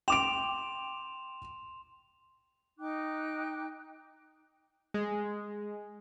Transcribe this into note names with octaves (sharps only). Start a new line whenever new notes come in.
G5 C6 D6 D7 E7 F7
D#4 G5 D6 F#6
G#3